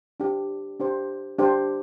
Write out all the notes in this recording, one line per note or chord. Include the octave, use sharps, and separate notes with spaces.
D4 G4 C5
D4 G4 C5
D4 G4 C5